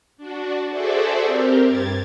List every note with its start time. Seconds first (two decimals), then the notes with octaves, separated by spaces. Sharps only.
0.17 D4 F#4
0.70 F#4 G#4 A4 C5 D5 E5
1.23 C4 G4 A#4
1.66 G2 G#6 A6